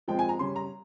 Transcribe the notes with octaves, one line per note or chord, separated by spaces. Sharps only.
F3 G#3 C4 G5
G#5
A#5
C#3 G3 C#4 C6
A#5